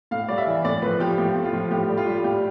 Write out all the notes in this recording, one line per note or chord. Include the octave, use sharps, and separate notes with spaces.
A2 F5
G3 D5
E5
E3
A2 D5
F3 B4
F3 G4
A2 G4
A2
F4
F3
A2 G4
G3
F4
G3
A2 G4